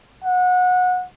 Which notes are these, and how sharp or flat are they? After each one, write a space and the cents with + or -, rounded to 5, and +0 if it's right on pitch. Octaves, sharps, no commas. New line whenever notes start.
F#5 -25